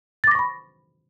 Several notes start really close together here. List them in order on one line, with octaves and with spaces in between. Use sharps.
A6 D6 A#6 C#6 B5